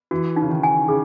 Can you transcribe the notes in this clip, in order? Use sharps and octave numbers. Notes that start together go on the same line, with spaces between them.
E3 F#4
D#4
C#3
D#3
G#5
C#3 G#4